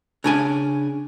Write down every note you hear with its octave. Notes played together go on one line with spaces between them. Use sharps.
C#3 D4 G#5